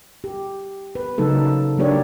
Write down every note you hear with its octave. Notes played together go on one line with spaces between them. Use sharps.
G4
B4
C#3 F#3 A#3 D#4 A4
F#3 A#3 D4 G4 C#5 D5